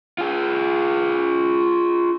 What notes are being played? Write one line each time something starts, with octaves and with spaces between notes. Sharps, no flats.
F4 G#4